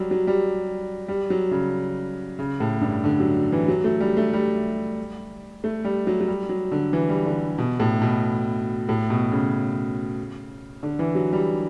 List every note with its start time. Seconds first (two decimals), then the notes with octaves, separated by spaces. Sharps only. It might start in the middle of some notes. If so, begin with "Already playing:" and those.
Already playing: F#3 G3
0.11 F#3
0.27 G3
1.08 G3
1.30 F#3
1.51 C#3
2.39 C#3
2.60 A2
2.81 G2
3.04 D3
3.20 F#3
3.52 E3
3.68 F#3
3.84 A3
4.00 G3
4.17 A3
4.33 G3
5.64 A3
5.84 G3
6.07 F#3
6.21 F#3
6.28 G3
6.49 F#3
6.71 D3
6.93 E3
7.09 G3
7.26 D3
7.58 B2
7.80 A2
8.02 B2
8.89 A2
9.10 B2
9.32 C#3
10.83 D3
10.99 E3
11.15 F#3
11.33 G3